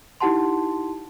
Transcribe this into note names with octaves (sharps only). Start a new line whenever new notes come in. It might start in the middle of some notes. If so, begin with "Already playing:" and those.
D#4 E4 G4 F#5 A5 C6